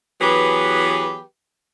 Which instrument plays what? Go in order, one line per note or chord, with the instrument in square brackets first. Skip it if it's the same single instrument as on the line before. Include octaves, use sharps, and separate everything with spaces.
[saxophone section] E3 F#3 B3 G4 G#4 B4